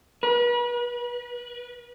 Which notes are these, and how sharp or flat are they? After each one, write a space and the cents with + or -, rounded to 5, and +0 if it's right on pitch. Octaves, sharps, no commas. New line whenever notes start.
B4 -35